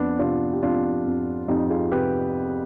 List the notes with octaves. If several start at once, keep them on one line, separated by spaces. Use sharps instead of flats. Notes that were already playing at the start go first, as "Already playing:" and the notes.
Already playing: F2 B3 D4
C3 D4 F4
G4
F2 D4 F4
F2
F2 D#4 G4
F4 G#4
C3 G4 B4